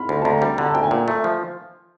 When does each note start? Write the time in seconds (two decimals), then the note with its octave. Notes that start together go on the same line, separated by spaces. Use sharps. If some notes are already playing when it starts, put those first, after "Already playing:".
Already playing: B5 C6 F6
0.09 D2
0.22 A5
0.25 D2 A#5
0.42 G3
0.58 D3 A#5
0.66 A5
0.74 D2 G5
0.83 G#5
0.91 A#2
1.08 A3
1.24 F3